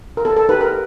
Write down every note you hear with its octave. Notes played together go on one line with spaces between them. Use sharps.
A#4
B3 A4
A4
D#4 G4 B4
A#4